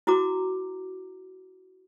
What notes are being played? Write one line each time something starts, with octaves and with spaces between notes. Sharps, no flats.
E4 F#4 A#5 D6